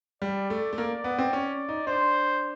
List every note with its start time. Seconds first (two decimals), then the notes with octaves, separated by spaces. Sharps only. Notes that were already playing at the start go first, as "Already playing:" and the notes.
0.22 G3 D5
0.50 A3
0.73 A3
0.78 A#3
1.04 B3
1.19 C4
1.33 C#4
1.69 D#4
1.87 D4 C5